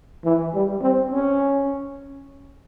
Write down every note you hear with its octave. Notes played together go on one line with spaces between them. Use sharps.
E3
G3
C4
C#4